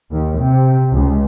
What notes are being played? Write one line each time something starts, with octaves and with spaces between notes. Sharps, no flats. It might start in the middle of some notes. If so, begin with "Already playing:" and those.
D#2
C3
C#2